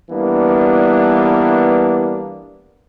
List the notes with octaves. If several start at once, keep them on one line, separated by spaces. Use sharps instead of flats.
E3 G3 A#3 B3 D4